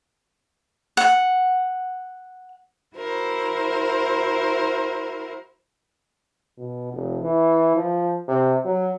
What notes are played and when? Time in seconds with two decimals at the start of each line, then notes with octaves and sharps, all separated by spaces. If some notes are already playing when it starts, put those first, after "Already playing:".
0.97 F#5
2.96 E4 F#4 A#4 C5
6.58 B2
6.93 F1
7.22 E3
7.76 F3
8.28 C3
8.65 F#3